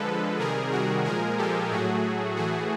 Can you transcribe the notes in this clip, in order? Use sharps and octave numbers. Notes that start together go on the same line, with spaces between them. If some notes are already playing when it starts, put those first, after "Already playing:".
Already playing: D3 F3 G#3 A4 B4
C3 D#3 G3 G#4 A#4
F#4 G#4
A#2 F3 G#3 G#4 A#4
G4 A4
A2 F#3 A3 F#4 G#4
A2 E3 A3 F#4 G#4